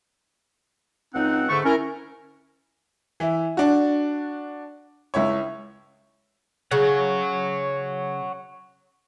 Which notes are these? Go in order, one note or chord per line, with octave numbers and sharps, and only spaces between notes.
C#2 C4 D#4 F#5
G#2 D3 A3 C#6
C#4 E4 A#4
E3 E4
D4 F#4
C#2 E4 C#5
C#3 C#5 F#5